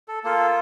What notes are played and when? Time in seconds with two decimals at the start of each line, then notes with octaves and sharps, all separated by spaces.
0.08 A4
0.24 A#3 F4 A4